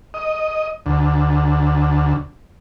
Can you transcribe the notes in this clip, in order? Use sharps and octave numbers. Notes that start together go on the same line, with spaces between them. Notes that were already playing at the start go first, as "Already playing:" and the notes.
D#5
D2